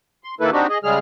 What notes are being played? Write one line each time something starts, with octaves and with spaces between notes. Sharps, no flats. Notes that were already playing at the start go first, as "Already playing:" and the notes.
C6
D#3 A#3 E4 A4 B4
C4 D4 D#4 F#4 G4
G#4 D#5
C#3 G3 G#3 G#4 F6